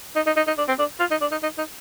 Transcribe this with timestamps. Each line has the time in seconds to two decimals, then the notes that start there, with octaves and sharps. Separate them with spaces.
0.16 D#4
0.27 D#4
0.37 D#4
0.47 D#4
0.58 D4
0.68 C4
0.79 D4
1.00 F4
1.11 D#4
1.21 D4
1.32 D#4
1.43 D#4
1.58 D#4